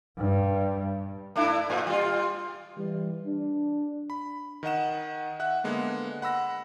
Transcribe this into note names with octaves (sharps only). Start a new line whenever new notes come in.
G2
A3 D4 E4
A2
G3 F4
E3 G3
D4
B5
D#3 D#5 F#5 E7
E5 F#5 F#6
D3 G#3 A#3 B3
F#5 B5 E6 A#6